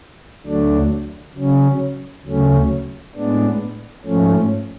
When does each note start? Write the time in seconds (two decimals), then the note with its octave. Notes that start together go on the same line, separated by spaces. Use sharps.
0.46 D2 D3 F#3 A3 D4
1.35 C#3 F#3 C#4
2.25 D2 C#3 F#3 A3 C#4
3.15 A2 G#3 B3 D4
4.05 G#2 F3 A3 C#4